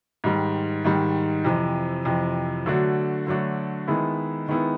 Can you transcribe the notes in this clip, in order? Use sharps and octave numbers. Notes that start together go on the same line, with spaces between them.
G#2 D#3 G3
G#2 D#3 G3
F2 C3 E3
F2 C3 E3
D3 F#3 A3 D4 F#4
D3 F#3 A3 D4 F#4
D#3 G#3 B3 E4
D#3 G#3 B3 E4